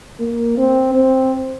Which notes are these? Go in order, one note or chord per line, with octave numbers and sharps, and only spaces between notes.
A#3
C4
C4